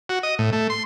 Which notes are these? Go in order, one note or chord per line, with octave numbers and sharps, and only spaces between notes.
F#4
D#5
A2
A3
C6